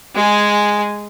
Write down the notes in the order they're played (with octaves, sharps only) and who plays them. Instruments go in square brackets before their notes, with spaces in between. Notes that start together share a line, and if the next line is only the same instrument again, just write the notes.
[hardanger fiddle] G#3 G#4